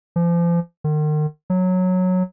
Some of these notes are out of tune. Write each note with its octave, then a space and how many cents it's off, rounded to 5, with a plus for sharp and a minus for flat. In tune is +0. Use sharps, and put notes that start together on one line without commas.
F3 -35
D#3 -40
F#3 -10